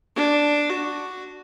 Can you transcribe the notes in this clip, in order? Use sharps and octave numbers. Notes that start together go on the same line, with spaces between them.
D4
F#4